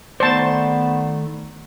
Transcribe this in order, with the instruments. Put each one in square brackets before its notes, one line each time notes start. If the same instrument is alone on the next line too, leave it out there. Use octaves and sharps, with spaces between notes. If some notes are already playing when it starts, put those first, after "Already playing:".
[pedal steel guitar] D#3 A3 D5 [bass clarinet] B3 [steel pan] C5 A5